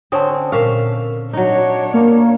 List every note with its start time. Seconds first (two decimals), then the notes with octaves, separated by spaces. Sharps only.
0.12 D3 C4 C#4 A5 C#6 D#6
0.52 A#2 A#4 E5 F5 C#6
1.33 F#3 D4 D#4 C#5
1.94 A#3 F5